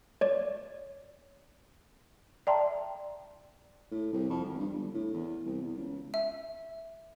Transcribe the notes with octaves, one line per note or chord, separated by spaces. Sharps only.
C#5 D5
D5 E5 G5 A5 A#5 C6
A2
C2
F2
G#1
G2
G1
A2
E2
C2
E2
C#2
E5